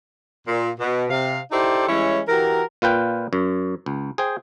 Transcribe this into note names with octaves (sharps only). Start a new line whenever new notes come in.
A#2
B2
C3 F5
D#4 E4 G4 A4 C5 D5
E3 G3 G#3 C#4 E4 C#5
E3 F#4 G4 A#4
A#2 F4 B4 G5
F#2
C#2
G#4 C5 G5